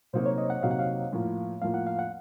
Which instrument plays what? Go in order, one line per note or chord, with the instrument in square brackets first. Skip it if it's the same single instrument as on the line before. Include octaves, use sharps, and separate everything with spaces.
[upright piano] C3 F#3 A#3 D#4 F#4 [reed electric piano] C5
[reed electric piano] C#5
D#5
F#5
[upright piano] C3 F#3 A#3 D#4 F#4 [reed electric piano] F5
[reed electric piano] F#5
F5
[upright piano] A2 F3 A#3 F4
[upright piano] A2 F3 A#3 F4 [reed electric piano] F5
[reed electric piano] F#5
F5
F#5